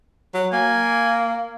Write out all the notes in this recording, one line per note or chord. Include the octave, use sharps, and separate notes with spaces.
F#3
A#3 G#5